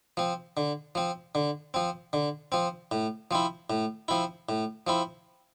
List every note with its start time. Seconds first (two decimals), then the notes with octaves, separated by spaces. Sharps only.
0.17 F3 C4
0.57 D3
0.95 F3 C4
1.35 D3
1.74 F3 C4
2.13 D3
2.52 F3 C4
2.91 A2
3.31 F3 C4 E4
3.70 A2
4.08 F3 C4 E4
4.49 A2
4.87 F3 C4 E4